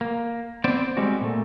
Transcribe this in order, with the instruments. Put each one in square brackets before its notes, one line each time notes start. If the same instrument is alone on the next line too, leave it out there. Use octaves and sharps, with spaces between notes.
[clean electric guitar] A#3
B3 C4 C5 D5
G3 G#3 C4 F#4
A#2 A3